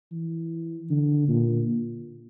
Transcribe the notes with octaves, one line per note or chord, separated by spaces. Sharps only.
E3
D3
A#2